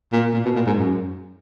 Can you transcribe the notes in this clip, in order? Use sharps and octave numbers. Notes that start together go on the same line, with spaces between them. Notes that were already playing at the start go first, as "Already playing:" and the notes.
A#2
A#2
B2
A#2
G#2
F#2